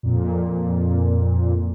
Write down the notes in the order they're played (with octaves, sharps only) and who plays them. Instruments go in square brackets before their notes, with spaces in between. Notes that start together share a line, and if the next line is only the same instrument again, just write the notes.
[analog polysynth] F2 A#2